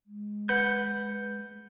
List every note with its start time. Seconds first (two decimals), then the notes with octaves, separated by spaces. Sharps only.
0.06 G#3
0.49 B4 F#5 G6